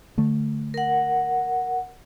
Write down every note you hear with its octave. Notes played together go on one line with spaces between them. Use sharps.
D3 A3
A#4 F#5